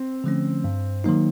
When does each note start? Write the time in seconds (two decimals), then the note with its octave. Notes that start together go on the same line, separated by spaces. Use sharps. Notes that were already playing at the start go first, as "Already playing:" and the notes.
Already playing: C4
0.24 D3 F3 A3 C#4
0.64 G2
1.04 D#3 F#3 A#3 D#4